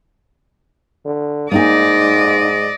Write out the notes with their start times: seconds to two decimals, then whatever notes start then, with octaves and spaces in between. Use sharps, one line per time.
1.06 D3
1.52 G#2 A#3 D#4 D5 D#5 G#5